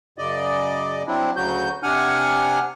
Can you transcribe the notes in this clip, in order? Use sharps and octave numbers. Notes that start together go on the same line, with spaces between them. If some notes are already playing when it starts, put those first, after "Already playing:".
F#2 C#3 D5 D#5
F#3 C4 D4 E4
D2 C#3 F#3 F#4 G6
C3 D4 F#5 G#5 F6